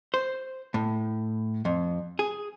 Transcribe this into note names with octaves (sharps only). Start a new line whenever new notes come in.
C5
A2
F2
G#4